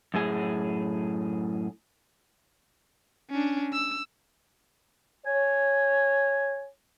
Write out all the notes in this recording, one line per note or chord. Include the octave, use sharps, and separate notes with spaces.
F#2 A2 G#4
C#4 D4
E6
C#5 G#5